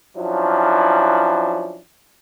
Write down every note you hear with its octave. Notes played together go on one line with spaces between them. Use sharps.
F3 F#3 C#4 D4 E4